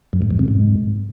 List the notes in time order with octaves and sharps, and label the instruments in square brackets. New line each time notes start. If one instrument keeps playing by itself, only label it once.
[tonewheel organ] F#2
G#2
F2
C3
G#2